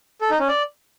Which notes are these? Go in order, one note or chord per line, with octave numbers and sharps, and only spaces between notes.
A4
D#4
C#4
D5